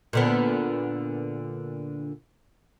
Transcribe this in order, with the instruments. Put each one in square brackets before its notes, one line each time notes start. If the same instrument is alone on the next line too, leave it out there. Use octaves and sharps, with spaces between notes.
[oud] A#2 D3 B3